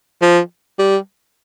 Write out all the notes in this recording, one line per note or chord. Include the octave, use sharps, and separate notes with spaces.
F3
G3